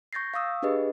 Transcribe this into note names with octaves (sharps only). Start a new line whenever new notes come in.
C#6 G6 A6 A#6 C7
F5 C#6 D#6 E6
D4 G4 G#4 B4 D#5